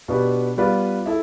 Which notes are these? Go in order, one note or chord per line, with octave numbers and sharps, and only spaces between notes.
B2 B3 D4 G4 B4
G3 B3 F4 B4 D5
E4 A4 E5